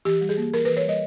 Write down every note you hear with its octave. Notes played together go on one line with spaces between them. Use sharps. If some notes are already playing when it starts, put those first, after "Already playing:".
E3 G4
G3
G#4
A#3
E3 A#4
E3 B4
C#5
G3 D#5